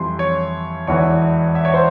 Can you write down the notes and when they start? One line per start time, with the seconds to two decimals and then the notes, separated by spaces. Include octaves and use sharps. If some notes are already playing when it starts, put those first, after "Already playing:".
Already playing: F2 E3 G3 C6
0.19 C#5
0.87 E1 E2 E3 C#5
1.55 E5
1.65 C#5
1.74 C5